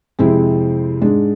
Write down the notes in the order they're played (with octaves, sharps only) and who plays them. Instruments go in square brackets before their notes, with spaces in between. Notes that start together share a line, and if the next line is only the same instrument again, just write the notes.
[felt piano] F2 C3 G#3 C4 E4
G#2 G#3 D4